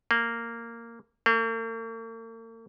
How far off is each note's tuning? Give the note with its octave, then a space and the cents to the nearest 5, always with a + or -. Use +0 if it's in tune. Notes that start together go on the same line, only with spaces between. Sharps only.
A#3 -10
A#3 -45